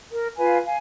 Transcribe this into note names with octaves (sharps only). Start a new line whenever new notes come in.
A#4
F4 B4 F5 G#5
F5 G#5